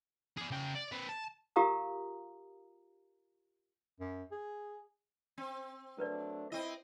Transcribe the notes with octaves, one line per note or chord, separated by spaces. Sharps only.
G#4 D5
C#3 G5
D5
C4 B4
A5
F4 G4 A#4 F5 A#5 D#6
F#2
G#4
C4
F#3 A3 D4 A#4 B4 D5
C4 E4 D#5